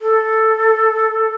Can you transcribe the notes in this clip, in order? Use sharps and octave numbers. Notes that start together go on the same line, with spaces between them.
A4